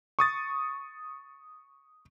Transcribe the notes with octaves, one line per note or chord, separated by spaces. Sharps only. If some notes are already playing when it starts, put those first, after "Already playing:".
C#6 D#6 A6